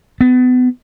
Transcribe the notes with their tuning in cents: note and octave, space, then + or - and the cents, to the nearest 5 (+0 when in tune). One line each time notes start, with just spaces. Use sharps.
B3 +30